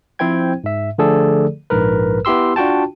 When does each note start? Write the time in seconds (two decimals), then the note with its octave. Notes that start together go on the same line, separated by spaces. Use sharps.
0.19 F3 C4 E4 C5 G5 G#6
0.64 G#2 E5
0.98 D3 F3 A3 G#4 A4 D5
1.70 A#1 G#2 A#4 B4
2.25 B3 E4 G4 C6 E6
2.56 D4 F4 F#4 G5 A5